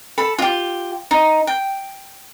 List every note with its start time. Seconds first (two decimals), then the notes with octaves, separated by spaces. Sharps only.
0.18 A4 A5 B5
0.38 F4 G4
1.11 D#4
1.47 G5